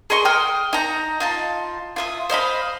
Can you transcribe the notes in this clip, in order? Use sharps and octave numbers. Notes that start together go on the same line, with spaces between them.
G#4 D#5 C6 C#6
G5 C6 D#6 F6
D#4 A#5
D#4 F4 A5
F4 E5 D#6
C5 D#5 F5 B5